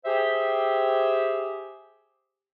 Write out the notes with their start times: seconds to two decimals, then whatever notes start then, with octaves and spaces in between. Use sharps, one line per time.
0.05 G4 G#4 C5 E5